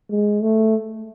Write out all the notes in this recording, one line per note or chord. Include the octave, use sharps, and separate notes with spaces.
G#3
A3